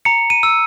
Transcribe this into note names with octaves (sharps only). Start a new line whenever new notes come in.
A#5 C#7
D#7
E6